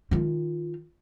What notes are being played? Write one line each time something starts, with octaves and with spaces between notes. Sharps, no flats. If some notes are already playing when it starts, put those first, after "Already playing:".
D#3 F4